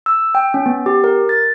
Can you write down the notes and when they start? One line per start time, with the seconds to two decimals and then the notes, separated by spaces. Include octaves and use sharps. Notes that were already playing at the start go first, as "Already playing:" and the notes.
0.06 E6
0.35 G5
0.54 C#4
0.66 B3
0.86 G4
1.04 A#4
1.29 A6